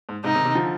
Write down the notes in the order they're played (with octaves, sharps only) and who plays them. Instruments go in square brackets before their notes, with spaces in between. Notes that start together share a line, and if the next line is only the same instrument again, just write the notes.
[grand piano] G#2
[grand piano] G#2 C3 [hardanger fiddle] D#4
[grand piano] C3 D#3
C3 D#3
D3 F3